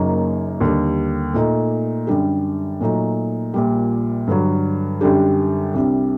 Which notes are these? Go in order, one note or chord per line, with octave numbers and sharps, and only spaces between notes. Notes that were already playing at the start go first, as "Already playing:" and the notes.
Already playing: F#1 F#2 F#3 A#3 D#4
D#2 D3 G3
A#2 A3 D#4
F#2 D3 G3 D4 G4
A#2 F#3 A3 D#4
A#1 A#2 G3
G2 D3 F#3
F#2 D3 G3 D4 G4
C2 C3 G3 D4